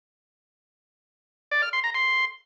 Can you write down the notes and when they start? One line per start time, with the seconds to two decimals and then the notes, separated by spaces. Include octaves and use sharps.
1.51 D5
1.62 F6
1.73 C6
1.84 A#5
1.94 C6